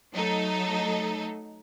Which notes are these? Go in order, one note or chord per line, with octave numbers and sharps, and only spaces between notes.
F#3 A3 D#4 A4